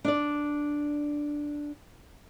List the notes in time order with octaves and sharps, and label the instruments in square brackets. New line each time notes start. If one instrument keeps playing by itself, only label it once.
[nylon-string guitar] D4 D5